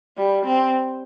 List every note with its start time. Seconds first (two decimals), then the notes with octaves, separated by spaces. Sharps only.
0.18 G3
0.46 C4